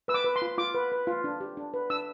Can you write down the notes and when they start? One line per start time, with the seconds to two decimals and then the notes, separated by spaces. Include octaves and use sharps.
0.08 B4 E6
0.14 D6
0.24 B4
0.36 C6
0.42 F4
0.58 F4 D6
0.75 B4
0.92 B4
1.07 F4
1.24 D4
1.40 G4
1.57 D4
1.74 B4
1.90 D4 E6